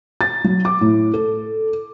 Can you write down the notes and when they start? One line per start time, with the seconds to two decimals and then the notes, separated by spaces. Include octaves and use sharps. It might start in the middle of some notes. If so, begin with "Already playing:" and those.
0.21 A6
0.44 F#3
0.65 D6
0.81 A2
1.14 A4